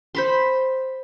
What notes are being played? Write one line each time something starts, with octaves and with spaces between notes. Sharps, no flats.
C5 B5 C6